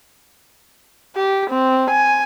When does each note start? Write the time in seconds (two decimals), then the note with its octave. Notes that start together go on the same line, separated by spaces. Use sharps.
1.16 G4
1.50 C4
1.90 G#5